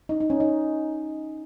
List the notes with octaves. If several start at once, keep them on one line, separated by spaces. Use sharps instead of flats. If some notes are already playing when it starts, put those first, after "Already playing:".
D#4
D#4
C#4
D#4